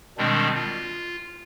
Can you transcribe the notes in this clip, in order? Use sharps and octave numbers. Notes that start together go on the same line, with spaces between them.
B2 D#3 G3 G#3 C4 D4
F4